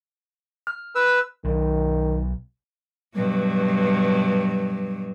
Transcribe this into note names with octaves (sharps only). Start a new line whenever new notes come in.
F6
B4 E6
B1 D#3
G2 B2 F#3